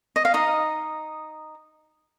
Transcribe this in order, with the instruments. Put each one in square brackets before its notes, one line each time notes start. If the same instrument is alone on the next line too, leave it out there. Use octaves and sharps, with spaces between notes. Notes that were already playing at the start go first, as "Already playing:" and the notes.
[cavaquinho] D#5
F5
D#4 D#5